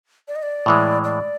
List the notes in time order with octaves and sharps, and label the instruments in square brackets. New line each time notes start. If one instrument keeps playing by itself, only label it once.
[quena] D5
D#5
D5
[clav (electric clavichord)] A2 E3 G#3
[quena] D5